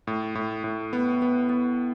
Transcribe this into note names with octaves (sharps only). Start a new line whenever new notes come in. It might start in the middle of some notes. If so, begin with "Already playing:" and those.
A2
A2
A2
B3
B3
B3